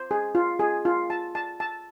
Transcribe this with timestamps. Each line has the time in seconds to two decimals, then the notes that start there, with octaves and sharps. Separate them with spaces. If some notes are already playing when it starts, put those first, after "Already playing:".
Already playing: C5
0.11 G#4
0.35 F4
0.59 G#4
0.85 F4
1.10 A5
1.35 A5
1.60 A5